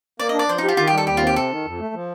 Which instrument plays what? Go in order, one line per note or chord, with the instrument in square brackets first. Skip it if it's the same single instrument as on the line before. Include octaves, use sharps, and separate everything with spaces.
[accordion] A#3 [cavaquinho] D5
[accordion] D4 [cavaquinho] D#5
[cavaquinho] D5
[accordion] F3 [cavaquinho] C5
[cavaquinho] D#4
[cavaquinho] F4 [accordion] G4
[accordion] D#3 [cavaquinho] F4
[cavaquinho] G4
[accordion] G3 [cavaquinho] A4
[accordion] D#2 [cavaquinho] G4
[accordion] C4 [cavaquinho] F4
[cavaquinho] G4
[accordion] C3 [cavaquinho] A4
[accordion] D#3
F2
A3
F3